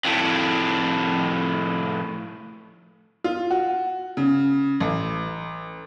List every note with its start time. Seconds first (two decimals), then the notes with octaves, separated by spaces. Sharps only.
0.05 F2 A2
3.24 F4
3.50 F#4
4.17 C#3
4.80 A1